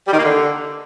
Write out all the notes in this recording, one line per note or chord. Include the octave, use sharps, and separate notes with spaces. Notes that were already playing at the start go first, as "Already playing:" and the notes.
G3
D#3
A#3
D3